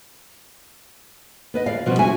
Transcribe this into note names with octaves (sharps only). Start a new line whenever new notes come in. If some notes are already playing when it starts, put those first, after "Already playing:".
B3 B4 D#5
D2 D5 F5
B2 F3 G3 B3 C4 F#4
E4 F#4 E5 G#5